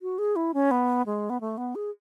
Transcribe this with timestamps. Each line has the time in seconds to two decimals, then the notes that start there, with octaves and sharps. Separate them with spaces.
0.02 F#4
0.18 G#4
0.36 E4
0.54 C#4
0.71 B3
1.06 G#3
1.30 B3
1.40 A3
1.57 B3
1.75 G#4